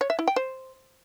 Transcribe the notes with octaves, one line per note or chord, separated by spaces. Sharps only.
C#5
E5
E4
G5
C5